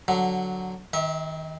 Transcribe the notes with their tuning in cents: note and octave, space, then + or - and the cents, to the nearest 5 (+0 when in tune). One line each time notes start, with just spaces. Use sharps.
D3 +0 F#3 +0
D#3 +25 E5 -30